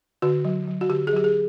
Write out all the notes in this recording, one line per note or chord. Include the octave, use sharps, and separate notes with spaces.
D3 F#4
F#3
F#3
F#4
D3 G4
G#4
F#3 G4
G#4